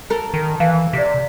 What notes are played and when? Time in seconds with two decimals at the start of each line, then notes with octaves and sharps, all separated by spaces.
0.10 A4 A#4
0.34 D#3
0.60 E3 F5
0.93 C3 D5 B6